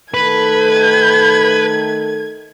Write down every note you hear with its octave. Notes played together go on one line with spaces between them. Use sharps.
D#3 A3 A4 B4 G#6